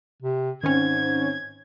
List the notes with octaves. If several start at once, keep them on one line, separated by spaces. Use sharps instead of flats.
C3
G#2 D#3 C4 C#4 G#6